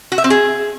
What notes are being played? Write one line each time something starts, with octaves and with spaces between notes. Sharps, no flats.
F#4
E5
C4
G#4